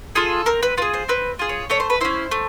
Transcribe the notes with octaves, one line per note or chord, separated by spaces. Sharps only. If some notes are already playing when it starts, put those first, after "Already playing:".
F4 G#4 A4
C4 A#4
B4
F4 G#4 B4
C5
C4 B4
F4 G#4
C#5
A3 C#5
C5
B4
C#4 E4 C5
A3